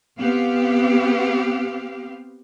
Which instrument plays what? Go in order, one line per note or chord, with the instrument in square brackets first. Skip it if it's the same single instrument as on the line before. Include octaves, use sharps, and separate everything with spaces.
[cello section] B3 C4 G4 F5